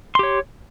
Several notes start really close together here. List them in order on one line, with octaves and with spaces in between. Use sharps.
C6 G4 C#5